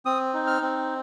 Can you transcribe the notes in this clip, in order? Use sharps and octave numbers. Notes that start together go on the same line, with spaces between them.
C4 D#6
D#4
F6
C4